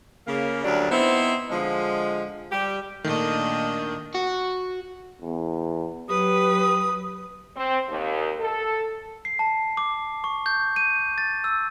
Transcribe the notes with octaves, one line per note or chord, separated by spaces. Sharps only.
C#3 A#3
D2 F#3 G3 D4
B3 C4 D#4 E4 C5
D3 F3 G#3
G3 G4
A#2 D#3 A3 D4 D#5
F#4
E2
F#3 G4 B4 D#6
C4
D#2
A4
C7
A5
D6
C#6
G6
D#7
A6
E6